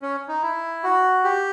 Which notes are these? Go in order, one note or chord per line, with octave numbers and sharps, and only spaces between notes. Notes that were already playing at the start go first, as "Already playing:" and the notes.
C#4
D#4
E4
F#4
G4